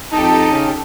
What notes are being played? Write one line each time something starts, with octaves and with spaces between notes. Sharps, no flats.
F2 D#4 G4 A4 A5 A#5
C#3 C#4